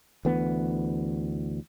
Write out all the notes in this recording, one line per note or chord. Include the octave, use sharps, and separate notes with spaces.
D2 E3 B3